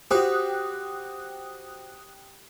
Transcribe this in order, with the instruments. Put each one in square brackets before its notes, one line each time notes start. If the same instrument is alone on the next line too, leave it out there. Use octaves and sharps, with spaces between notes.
[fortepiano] F#4 C5 [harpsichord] G4 [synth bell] G5 D#6 F#6